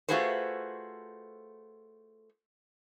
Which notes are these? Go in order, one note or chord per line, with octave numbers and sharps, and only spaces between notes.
A3 F4 F#4 G#4 B4 C5